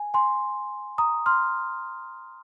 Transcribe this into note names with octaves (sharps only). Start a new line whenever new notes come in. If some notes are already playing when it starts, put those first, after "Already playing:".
Already playing: G#5
G#5 C6
A#5 D#6
C6 F6